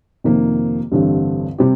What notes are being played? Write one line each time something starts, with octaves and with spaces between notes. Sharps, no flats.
F2 C3 D#3 A#3
A1 G2 D3 G3 C4
C3 G3 C4 G4